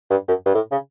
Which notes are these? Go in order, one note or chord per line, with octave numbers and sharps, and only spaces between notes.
G2
F#2
G2
A2
C#3